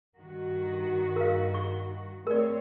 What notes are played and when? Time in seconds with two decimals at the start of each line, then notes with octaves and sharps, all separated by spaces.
0.19 G2 D#3 F#4
1.16 A#4 F5
1.54 C#6
2.27 A3 C4 A#4 C#5 D5